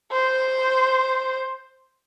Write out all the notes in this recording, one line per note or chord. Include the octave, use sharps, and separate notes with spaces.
C5